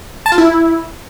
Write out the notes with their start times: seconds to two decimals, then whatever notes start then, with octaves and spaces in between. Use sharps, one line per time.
0.26 A5
0.32 F4
0.38 E4